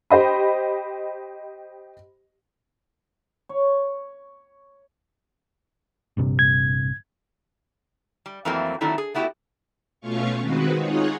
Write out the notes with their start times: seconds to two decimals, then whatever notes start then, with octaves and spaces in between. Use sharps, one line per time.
0.10 G4 C5 D#5 B5
3.49 C#5
6.17 A#1 G2 C3
6.39 G#6
8.26 G3
8.45 F2 E3 F#3 A3 A#3 C4
8.81 D#3 F#3 A3 C4 D4 E4
8.98 G#4
9.14 A3 B3 E4 F#4 G4
10.01 B2 A3 C#4 F4 F5 C#6
10.40 D#3 G#3 C4 F#4 B4
10.77 D#4 F4 G#4 C#5 F#5